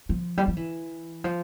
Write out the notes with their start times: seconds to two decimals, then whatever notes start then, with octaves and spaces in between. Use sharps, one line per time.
0.09 F3
0.37 G3
0.48 F3
0.57 E3
1.24 F3